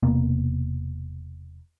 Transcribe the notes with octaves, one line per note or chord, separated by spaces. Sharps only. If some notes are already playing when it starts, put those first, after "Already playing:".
E1 C3 A#3 B3